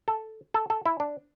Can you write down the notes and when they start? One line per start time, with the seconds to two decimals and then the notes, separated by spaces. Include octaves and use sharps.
0.08 A4
0.54 A4
0.70 A4
0.86 E4
1.00 D4